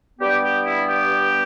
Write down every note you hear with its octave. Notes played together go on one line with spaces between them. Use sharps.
G2 G3 B3 G4
G4
E4
G4